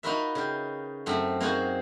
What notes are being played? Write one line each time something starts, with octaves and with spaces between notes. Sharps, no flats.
D#4 F4 F#4 A#4 B4 E5
C#3 G5
F#2 A3 C4
A#3 C4 D#4 F#4 G#4 C5